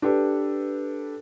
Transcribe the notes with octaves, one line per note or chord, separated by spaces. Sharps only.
D4 G4 A4 B4